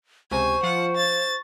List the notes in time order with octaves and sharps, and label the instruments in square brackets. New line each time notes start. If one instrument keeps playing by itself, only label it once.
[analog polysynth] C#2 C3 [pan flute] C5 [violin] G#5 [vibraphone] C#6
[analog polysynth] F3 F4 [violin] F#5
[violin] A6